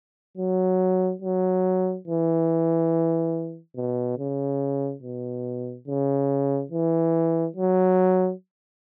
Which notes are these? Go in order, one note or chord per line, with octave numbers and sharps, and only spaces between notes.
F#3
F#3
E3
B2
C#3
B2
C#3
E3
F#3